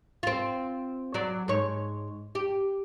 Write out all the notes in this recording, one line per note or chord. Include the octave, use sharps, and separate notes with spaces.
C4 F4
F#3 D5
G#2 C#5
G4